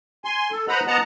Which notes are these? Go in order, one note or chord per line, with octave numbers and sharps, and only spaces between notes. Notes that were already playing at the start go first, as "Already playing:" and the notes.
G#5 C6
A4
B4 C5 D#5 F#5 A#5 B5
B3 D#5 F#5 A5 A#5